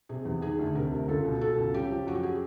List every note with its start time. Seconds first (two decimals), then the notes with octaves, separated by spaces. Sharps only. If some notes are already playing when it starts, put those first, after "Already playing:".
0.09 C3 G#4
0.25 E2
0.42 D#3 G#4
0.59 D2
0.75 C3 A#4
0.91 D2
1.08 C#2 A4
1.25 B2
1.41 B2 A4
1.58 C#2
1.74 C#3 G4
1.91 F3
2.07 F#2 F#4
2.15 G4
2.23 G#4